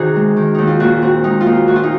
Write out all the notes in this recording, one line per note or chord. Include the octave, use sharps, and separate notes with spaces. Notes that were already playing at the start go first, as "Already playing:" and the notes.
Already playing: C3 D#3 D#4 F#4 G#4
G#3
D#3
D#2 D#4
F4
A#2 F#4
C4 F#4
G#3 D#4
F4
A#2 D#4
A#2 F#4
F4
D#4